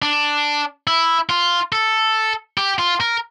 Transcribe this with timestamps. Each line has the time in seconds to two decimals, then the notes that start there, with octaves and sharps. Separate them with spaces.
0.02 D4
0.87 E4
1.30 F4
1.72 A4
2.58 G4
2.79 F4
3.00 A#4